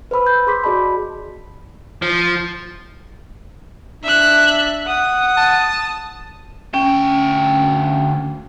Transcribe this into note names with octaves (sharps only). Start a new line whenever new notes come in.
B4 C5 B5 E6
G6
G#4 C6 D6 B6
F#4 G#4 D5 D#5 A5 B5
F3
D4 E5 F#6
F#5 D#6
A5
D2 C#4 G5